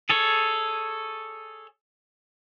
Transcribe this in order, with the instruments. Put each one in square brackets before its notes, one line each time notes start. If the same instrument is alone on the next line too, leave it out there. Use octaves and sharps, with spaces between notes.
[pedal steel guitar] G#4 A4 C#5